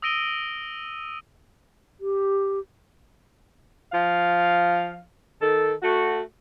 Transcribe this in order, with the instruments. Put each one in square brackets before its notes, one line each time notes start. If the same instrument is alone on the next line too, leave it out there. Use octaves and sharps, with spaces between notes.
[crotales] D#6 E6 A#6 D7 D#7 G7
[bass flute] G4
[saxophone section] F3 F5
D#3 A4
A3 F#4